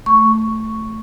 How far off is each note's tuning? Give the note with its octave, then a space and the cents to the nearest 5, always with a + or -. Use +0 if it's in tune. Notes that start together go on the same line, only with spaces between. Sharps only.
A3 +0 C#6 +0